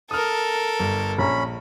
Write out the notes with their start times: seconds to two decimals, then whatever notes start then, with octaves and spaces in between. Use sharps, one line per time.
0.11 A4 A#4 D#6 F6
0.79 G1
1.19 A#1 C#4 A#5 B5